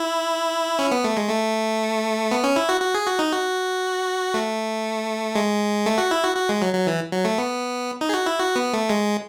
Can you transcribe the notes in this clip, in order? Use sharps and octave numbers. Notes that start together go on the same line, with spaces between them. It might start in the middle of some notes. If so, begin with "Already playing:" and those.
Already playing: E4
C#4
B3
A3
G#3
A3
B3
C#4
E4
F#4
F#4
G#4
F#4
D#4
F#4
A3
G#3
A3
F#4
E4
F#4
F#4
G#3
F#3
F#3
E3
F#3
A3
B3
D#4
G#4
F#4
E4
F#4
B3
A3
G#3